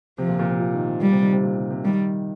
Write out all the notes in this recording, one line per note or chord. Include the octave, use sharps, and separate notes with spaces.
C3 F3
A#2
A#2
C3
F3
D#3
C3
A#2 G3
C3
D#3
C3
A#2
C3
C3
D#3 G3